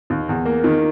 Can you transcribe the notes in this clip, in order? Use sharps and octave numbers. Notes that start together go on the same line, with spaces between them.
D#2
E2
A#3
D#3